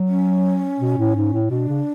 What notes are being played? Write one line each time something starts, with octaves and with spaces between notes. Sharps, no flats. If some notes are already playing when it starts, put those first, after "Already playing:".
Already playing: F#3
C#4
B2
A2
G#2
A2
B2 D4
C#3